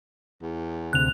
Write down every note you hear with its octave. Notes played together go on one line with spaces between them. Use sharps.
E2
D2 C3 F#6 F7